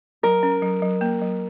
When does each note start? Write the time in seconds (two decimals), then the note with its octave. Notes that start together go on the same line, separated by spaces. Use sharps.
0.23 F#3 A#4
0.43 C#4
0.62 F#3
0.82 F#3
1.01 A#3
1.21 F#3